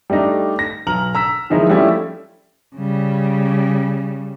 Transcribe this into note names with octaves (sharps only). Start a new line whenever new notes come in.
G3 A3 D4 D#4
A#6
B1 A#5 F6 F#7
A#5 E6 B6
D#3 F3 F#3 G#3 D#4 E4
F3 G3 A3 C#4 E4
C#3 G3